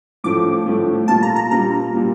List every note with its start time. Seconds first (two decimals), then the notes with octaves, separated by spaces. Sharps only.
0.24 A2 F3 A3 D6
0.66 A2 F3 A3
1.08 A#2 G3 A#3 F4 A5
1.23 A#5
1.36 A#5
1.50 A#2 G3 A#3 F4 A#5
1.93 A#2 G3 A#3 F4